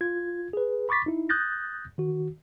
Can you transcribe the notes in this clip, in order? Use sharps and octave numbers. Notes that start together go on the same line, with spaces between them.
F4 G#6
G#4 B4
B5 C#6 D6 A6 B6
D#4 E4
D#6 F#6 G6 A6 A#6
D#3 F#4